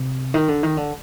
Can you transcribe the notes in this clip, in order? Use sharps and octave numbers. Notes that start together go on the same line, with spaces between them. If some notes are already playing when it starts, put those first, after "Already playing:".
Already playing: C3
D#3
D3
D#3
D3